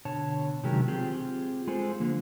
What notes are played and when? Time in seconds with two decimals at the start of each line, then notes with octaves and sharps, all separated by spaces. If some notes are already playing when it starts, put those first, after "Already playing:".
0.05 B2 D3 C#5 A5
0.63 C3 D#3 F#3 G#3 G4 A#4
0.88 C4 F4 G4 G#4
1.67 G#3 F4 G#4 A4 C5
2.00 D3 F3 A#3